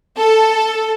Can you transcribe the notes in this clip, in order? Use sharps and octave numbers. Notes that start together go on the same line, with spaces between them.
A4